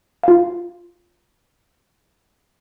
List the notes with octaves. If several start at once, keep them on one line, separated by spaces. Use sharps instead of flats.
F4 F5